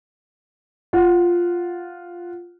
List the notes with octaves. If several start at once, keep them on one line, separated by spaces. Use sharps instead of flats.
F4 F#5